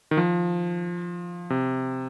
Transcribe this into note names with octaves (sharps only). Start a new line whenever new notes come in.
D#3
F3
C3